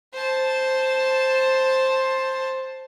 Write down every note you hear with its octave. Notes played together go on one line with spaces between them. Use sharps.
C5 A5